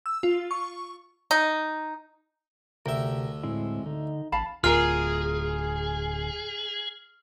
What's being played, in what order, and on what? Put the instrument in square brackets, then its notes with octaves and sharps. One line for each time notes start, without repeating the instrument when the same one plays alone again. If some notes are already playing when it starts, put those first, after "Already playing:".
[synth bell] E6
F4
C#6
[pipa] D#4
[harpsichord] D2 E5 [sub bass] C3 [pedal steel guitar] A#4 G5
[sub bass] A2 [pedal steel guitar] G#3 C4 E4
[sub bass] D3 [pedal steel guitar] D#4
[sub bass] A1 [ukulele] F5 A5 B5
[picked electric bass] D1 D2 [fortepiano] F4 A#4 [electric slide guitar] G#4 [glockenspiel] F6